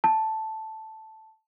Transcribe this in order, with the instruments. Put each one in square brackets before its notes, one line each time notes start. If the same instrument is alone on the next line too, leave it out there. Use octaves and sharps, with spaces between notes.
[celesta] A5